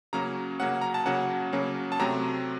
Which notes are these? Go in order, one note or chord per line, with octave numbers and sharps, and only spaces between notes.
C#3 F#3 A#3 C#4 A#5
C#3 F#3 A#3 C#4 F#5
A#5
A5
C#3 F#3 A#3 C#4 F#5
C#3 F#3 A#3 C#4
A5
C3 F#3 A3 C4 A#5